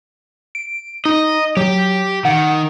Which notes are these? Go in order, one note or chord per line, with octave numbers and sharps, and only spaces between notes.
D7
D#4 D#5
F#3 G4
D#3 F#5